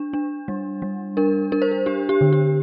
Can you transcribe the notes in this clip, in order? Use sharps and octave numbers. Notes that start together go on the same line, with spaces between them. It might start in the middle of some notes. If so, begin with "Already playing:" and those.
Already playing: D4
D4
G3
G3
D4 A#4
D4 A#4
C5
A#4
D4 G4
G4
D3
G4